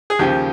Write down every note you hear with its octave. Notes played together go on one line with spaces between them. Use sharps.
G#4
D#2 C#3 F3 G4